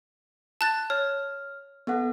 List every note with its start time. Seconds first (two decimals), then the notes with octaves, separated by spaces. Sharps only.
0.61 A5 F#6 A6
0.90 C#5 F6
1.87 B3 A4 F#5